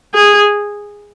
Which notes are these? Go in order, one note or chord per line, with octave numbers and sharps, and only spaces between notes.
G#4